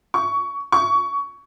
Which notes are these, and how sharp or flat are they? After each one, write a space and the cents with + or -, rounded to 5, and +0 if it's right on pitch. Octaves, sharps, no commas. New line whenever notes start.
C#6 +20
C#6 +20